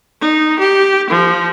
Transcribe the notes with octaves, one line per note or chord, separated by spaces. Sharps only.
D#4
G4
F3